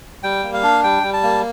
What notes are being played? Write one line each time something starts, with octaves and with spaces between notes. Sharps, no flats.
G3 G5
A#3
F5
D4
G3 G5
G3
A5
A#3